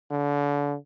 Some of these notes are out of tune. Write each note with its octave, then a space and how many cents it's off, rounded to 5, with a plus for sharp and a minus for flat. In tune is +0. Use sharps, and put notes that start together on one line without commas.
D3 -30